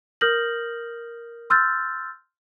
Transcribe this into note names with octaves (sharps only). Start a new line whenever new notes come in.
A#4 D#6 F6 G6 A#6 F#7
C6 E6 F6 G6 A6